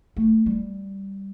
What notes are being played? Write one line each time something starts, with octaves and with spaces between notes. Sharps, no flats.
A3
G3